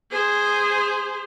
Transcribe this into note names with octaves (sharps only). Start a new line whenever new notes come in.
G#4 C5